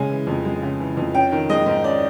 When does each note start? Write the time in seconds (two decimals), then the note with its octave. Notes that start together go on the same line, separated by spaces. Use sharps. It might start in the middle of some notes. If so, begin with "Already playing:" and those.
Already playing: C#3 G#3 G#5
0.10 E3
0.27 F2
0.45 G#3
0.62 C#3
0.80 E3
0.97 F2
1.14 C#4 G5
1.32 D#3
1.50 G#3 D#5
1.66 G#2
1.84 C#4 D5